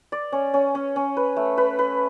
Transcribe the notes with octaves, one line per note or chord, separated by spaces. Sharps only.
D5
C#4
C#4
C#4
C#4
B4
A3
B4
B4